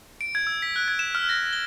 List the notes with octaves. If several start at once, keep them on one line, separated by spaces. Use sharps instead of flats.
D7
G#6
E6
B6
F#6
G#6
E7
F6
A#6
G7